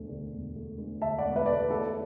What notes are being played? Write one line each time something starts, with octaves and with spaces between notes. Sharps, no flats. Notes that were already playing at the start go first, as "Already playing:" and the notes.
Already playing: E1 D2 A3
D3
E1
A3
D2
D3 E5 A5
D5 F#5
E1
B4 E5
A3 D5
B4
E2 A4